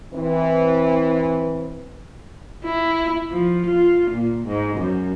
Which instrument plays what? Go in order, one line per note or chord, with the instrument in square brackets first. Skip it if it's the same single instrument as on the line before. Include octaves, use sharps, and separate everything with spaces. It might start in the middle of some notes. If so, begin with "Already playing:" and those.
[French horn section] E3 C4
[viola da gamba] E4
F3
F4
A#2
G#2
F#2